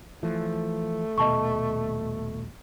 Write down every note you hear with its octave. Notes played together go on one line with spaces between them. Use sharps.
E3 F3 A3
D#1 B2 D#5 A5 C#6